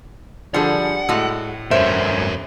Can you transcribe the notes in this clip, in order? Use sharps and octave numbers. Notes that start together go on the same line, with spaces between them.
D3 F3 G3 G#4 F#5
A2 G#3 F#4
G2 A3 C#4 A#4 C5 C#5 E5